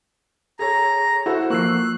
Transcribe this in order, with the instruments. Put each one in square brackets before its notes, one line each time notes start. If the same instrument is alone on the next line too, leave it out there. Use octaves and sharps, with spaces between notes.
[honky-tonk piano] G#4 A4 C#5 [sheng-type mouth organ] A#5
[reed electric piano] E4 [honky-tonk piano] F#4 A4 C5
[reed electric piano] F3 A#3 [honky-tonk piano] C#6 E6 C7 [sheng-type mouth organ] F#6